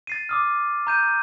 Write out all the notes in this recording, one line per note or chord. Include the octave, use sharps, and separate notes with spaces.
A6 C7 D#7
D6 D#6 F6
A#5 G6 D#7